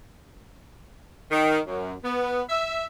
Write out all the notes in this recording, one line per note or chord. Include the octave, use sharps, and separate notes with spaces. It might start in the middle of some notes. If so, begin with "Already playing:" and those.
D#3
F#2
B3
E5